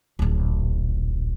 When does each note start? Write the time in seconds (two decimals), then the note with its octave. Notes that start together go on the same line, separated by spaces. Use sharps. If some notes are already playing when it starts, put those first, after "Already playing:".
0.19 D1 A#1